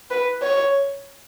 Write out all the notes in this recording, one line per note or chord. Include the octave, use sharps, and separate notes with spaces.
B4
C#5